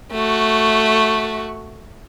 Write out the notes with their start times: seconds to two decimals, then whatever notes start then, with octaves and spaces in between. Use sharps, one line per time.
0.12 A3 F#4